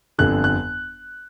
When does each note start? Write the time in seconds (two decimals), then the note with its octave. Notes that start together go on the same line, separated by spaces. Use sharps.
0.18 G1 F2 D3 F#6
0.44 F#6